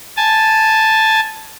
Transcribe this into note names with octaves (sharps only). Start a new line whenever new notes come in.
G#5 A5